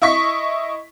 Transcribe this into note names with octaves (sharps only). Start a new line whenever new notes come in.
E4 D#5 C#6 B6